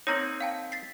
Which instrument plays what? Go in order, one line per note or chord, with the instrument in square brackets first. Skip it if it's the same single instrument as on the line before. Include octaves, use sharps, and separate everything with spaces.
[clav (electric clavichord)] A#3 C4 D#4 [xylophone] C#5 A#5 F#7
[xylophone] F5 G5 A5
A6 B6 C7